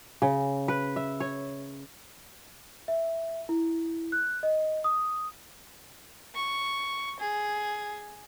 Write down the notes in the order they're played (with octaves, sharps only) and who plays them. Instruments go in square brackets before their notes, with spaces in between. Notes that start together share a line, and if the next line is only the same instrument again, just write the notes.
[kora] C#3
B4
E5
C#5
[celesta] E5
E4
F#6
D#5
D#6
[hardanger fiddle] C#6
G#4